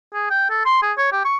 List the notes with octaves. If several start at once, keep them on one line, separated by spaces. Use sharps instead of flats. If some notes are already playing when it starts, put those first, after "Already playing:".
G#4
G5
A4
C6
G#4
C#5
G4
C#6